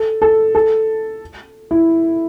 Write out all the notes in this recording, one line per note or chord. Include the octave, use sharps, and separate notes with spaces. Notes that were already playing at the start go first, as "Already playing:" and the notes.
Already playing: A4
A4
A4
E4